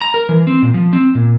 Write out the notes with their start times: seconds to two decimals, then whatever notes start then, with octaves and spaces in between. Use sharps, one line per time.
0.01 A#5
0.14 A#4
0.29 E3
0.47 C4
0.62 A#2
0.74 F3
0.93 C4
1.15 A#2